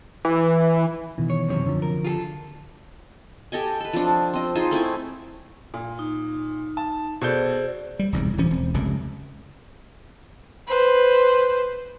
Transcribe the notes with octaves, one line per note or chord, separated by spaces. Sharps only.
E3
B2 D#3 E3
C#5
F#2 C3 C#5
D3 F3
A#4
F4 G#4 A4
G4 A4 D#5 G#5
A4 B4
F3 C4 D4
C4 D#5
D#4 F4 G#4 C5
A3 C4 E4 G#5
A#2
D#4
A5
B2 G#4 A4 C5 D5 G6
G3
E1 C2 G#2
D1 E3 F3 C#4
E1 C4
F1 C#2 F#2 C3
B4 C5